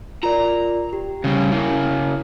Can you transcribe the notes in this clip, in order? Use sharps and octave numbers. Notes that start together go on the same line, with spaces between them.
F4 A#4 D5 A#5
G4
C#3 G3
C#3 A#3 E4